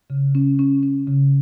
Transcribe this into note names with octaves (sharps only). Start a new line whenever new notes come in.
C#3
C#4
C#4
C#4
C#3